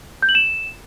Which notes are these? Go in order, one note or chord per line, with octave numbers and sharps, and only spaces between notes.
G6
F#7
E7